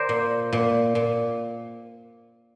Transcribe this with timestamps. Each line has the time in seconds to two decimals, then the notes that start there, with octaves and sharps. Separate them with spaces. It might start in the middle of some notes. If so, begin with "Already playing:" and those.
Already playing: A#4 C5 D5
0.09 A#2
0.53 A#2
0.95 A#2